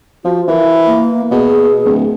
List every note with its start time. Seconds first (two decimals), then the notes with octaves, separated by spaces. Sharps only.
0.24 F3 F#4
0.48 E3 A#4
0.87 A#3
1.31 B2 G#4
1.85 D1